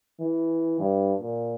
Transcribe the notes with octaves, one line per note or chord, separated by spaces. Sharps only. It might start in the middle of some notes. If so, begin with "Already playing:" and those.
E3
G2
A#2